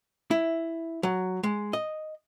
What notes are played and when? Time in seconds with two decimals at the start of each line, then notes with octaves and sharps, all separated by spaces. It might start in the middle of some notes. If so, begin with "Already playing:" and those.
0.31 E4
1.03 F#3
1.43 G#3
1.73 D#5